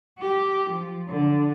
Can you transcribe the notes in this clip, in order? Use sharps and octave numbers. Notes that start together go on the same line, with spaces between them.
G4
F3
D3